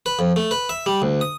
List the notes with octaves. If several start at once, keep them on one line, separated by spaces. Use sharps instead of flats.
B4
F2
A3
B4
E5
G3
D2
D#6